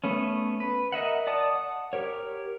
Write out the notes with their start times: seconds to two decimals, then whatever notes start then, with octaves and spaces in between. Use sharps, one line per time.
0.04 A3 B3 C#4
0.60 B4
0.92 A#4 D#5 E5 F#5
1.27 D5 F#5 A5 D#6
1.55 F#5
1.93 G4 A#4 C#5